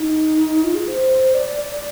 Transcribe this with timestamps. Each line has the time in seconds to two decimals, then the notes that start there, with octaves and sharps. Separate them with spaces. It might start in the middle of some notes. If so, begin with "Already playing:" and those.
Already playing: D#4
0.64 F4
0.75 G#4
0.88 C5
1.34 D5
1.53 D5
1.71 D5